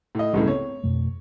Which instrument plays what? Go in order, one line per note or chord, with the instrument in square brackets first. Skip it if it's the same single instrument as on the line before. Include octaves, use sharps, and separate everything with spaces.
[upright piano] A2 D#5
[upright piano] G1 C#2 A2 [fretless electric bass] G3 G#3
[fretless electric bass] C4 [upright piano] C#5
[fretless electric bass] F2 B2 A3